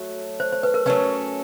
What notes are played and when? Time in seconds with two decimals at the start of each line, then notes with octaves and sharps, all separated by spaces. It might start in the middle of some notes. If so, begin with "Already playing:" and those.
Already playing: F#3 A3
0.40 C5
0.52 C5
0.63 B4
0.74 A#4
0.86 F#3 A3 C#4 B4